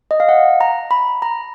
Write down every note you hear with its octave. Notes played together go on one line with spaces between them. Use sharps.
D#5
F5
F#5
A#5
B5
A#5